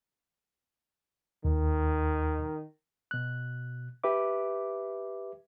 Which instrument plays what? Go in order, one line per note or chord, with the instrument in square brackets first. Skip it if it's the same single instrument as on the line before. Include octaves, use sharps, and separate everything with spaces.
[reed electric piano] D#2 [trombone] D#3
[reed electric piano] B2 F#6
G4 B4 E5 D6